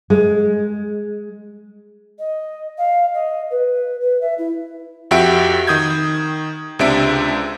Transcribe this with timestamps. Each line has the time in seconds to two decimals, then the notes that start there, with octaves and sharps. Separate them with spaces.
0.10 G#3
2.19 D#5
2.78 F5
3.14 D#5
3.51 B4
4.01 B4
4.21 E5
4.38 E4
5.11 F2 F#4 G4 E5 D7
5.67 D#3 D#6 G6 G#6
6.79 C#2 C3 D4 E5 D7